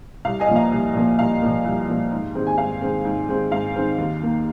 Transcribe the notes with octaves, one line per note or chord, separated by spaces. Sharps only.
C2 F5
D#5 G#5
A#2 F3 A#3
F5 A#5
C2
A#2 F3 A#3
C2 F5
A#2 F3 A#3
C2
A#2 F3 A#3
G#2
D#3 G#3 C4
G#5
G#2 F5
D#3 G#3 C4
G#2
D#3 G#3 C4
G#2 F5
D#3 G#3 C4
D#2
D#3 A#3